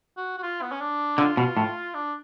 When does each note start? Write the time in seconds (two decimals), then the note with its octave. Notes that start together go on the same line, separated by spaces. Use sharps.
0.17 F#4
0.38 F#4
0.43 F4
0.62 B3
0.72 C#4
0.81 D4
1.18 D3 F4
1.37 B2
1.57 A2
1.94 D4